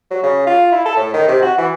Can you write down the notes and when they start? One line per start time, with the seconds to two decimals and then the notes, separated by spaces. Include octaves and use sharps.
0.11 F#3
0.23 C#3
0.47 F4
0.72 E4
0.85 A4
0.97 A2
1.14 D#3
1.28 C3
1.42 F#4
1.58 E3